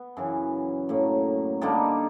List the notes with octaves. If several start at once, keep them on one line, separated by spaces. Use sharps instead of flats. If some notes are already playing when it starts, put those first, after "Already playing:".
Already playing: B3
F#2 C#3 E3
A2 F#3 A#3
D3 G3 A#3 D#4